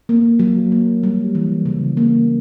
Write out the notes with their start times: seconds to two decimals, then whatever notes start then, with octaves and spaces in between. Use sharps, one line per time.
0.09 A#3
0.39 F#3
0.72 A#3
1.03 G3
1.35 E3
1.65 C#3
1.97 A#3